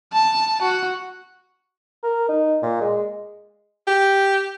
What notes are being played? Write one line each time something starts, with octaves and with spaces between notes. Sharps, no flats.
A5
F#4
A#4
D#4
A#2
G#3
G4